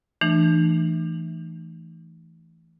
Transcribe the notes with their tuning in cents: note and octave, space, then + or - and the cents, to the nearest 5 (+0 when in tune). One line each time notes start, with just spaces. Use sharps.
E3 +0 A3 +0 D4 +45